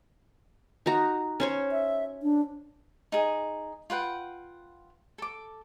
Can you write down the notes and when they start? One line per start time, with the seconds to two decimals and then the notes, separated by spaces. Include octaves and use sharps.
0.86 D#4 F#4 A#5
1.40 C#4 C5 C#5
1.72 E5
2.23 D4
3.12 D#4 G#4
3.90 F4 B4 F#5 G5
5.18 A4 D6